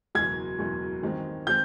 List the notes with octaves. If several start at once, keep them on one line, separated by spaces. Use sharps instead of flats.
F#1 E2 B2 G#3 G#6
F#1 E2 B2 G#3
A1 G2 D#3 G#3 C4
D#3 G#3 C4 G6